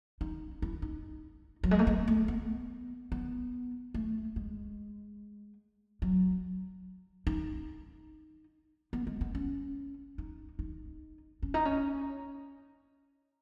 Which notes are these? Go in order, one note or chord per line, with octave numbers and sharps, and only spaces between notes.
D#4
E4
D#4
F#3
G#3
A3
B3
A3
B3
B3
A3
G#3
F#3
D#4
B3
G#3
B3
C#4
D#4
D#4
C#4
D#4
C#4